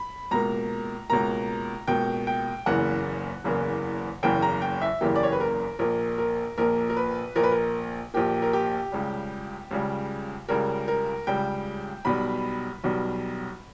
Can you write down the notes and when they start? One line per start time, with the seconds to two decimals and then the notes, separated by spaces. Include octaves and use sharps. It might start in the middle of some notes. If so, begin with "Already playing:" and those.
Already playing: B5
0.31 C#2 B2 A#3 A#5
1.10 C#2 B2 A#3 A#5
1.87 C#2 B2 A#3 G5
2.27 G5
2.66 F#1 E2 C#3 E3 A#3 F#5
3.44 F#1 E2 C#3 E3 A#3
4.23 F#1 E2 C#3 E3 A#3 G5
4.42 A#5
4.62 G5
4.81 E5
5.01 F#1 E2 C#3 E3 A#3 G4
5.16 D5
5.23 C#5
5.32 B4
5.40 A#4
5.79 A#1 A#2 A#3 A#4
6.18 A#4
6.58 A#1 A#2 A#3 A#4
6.90 A#4
6.97 B4
7.36 A#1 A#2 A#3 A#4
7.43 B4
7.51 A#4
8.14 A#1 A#2 A#3 G4
8.42 A#4
8.53 G4
8.92 C#2 C#3 G3
9.71 C#2 C#3 G3
10.49 C#2 C#3 G3 A#4
10.88 A#4
11.27 C#2 C#3 G3 G5
12.05 B1 B2 G3 B5
12.84 B1 B2 G3